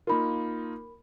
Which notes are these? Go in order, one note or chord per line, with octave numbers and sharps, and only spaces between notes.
A#3 D#4 F4 A#4 B5